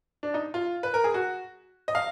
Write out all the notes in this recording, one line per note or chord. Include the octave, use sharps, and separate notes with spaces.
D4
D#4
F4
B4
A#4
G#4
F#4
D#5
F5